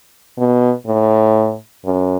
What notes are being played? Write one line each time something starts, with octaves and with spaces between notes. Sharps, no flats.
B2
A2
F#2